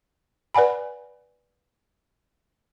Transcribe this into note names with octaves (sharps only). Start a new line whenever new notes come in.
B4 D5 F#5 G#5 B5